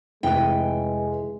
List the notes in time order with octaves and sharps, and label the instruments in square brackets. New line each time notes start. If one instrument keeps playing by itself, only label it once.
[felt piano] F1 [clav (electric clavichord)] E3 [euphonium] G#3 [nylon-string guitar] B4 G5